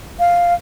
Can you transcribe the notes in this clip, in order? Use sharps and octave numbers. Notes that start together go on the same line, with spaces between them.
F5